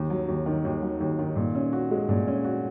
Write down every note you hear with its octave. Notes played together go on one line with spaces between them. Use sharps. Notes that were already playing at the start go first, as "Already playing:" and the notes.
Already playing: D#2
F#3
D#2
D#3
D#2
F#3
D#2
D#3
A#2
C#4
F#4
G#3
A#2
C#4
F#4